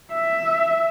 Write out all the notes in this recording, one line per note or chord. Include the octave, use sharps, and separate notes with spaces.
E5